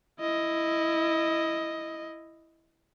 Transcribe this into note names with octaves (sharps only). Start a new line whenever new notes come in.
E4 D#5